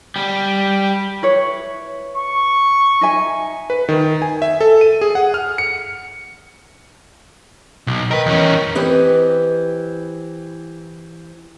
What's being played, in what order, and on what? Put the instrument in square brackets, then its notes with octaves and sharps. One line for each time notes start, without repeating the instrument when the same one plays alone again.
[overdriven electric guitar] G3
[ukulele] E4 B4 C#5
[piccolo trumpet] C#6
[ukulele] D#4 E5 G#5
[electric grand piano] B4
D#3
G#5
E5
A4
D#7
G#4
F#5
F6
C#7
[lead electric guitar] B1
[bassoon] D#3 [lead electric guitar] A#4 B4
[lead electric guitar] E2 C#4
[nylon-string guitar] E3 C4 G4 B4 D#5